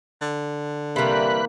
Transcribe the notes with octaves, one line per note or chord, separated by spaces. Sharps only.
D3
C3 E3 G3 A#3 B4 B5 F#6